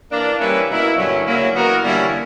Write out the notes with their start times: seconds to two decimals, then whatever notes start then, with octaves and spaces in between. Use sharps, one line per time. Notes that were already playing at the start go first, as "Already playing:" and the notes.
0.12 E3 A#3 D4
0.40 G3 A#3 C#4 E4 B4
0.69 B2 A#3 E4
0.98 G2 D3 F#3 C#4 E4
1.26 C#3 F#3 A#3 E4
1.55 E3 B3 F#4 A#4
1.84 D3 G3 A#3 C#4 E4